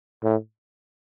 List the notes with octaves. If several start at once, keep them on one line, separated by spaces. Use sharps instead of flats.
A2